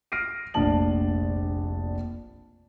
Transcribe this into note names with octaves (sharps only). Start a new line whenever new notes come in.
F6 A#6 C7 D7 D#7
F1 A#1 D4 D5 A5 F#7